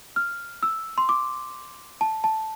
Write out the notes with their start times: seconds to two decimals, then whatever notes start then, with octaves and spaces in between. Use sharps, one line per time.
0.16 F6
0.63 E6
0.98 C6
1.09 D6
2.01 A5
2.24 A5